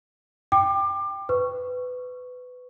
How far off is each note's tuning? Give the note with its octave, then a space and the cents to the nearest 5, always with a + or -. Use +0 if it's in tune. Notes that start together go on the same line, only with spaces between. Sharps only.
G5 +0 D6 +30
B4 +20 C#6 +0